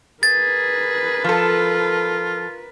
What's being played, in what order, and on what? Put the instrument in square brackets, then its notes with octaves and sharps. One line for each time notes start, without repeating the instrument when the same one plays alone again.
[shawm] G#4 [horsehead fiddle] A#4 B4 [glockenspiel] A6
[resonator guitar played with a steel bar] F3 A4 [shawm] F4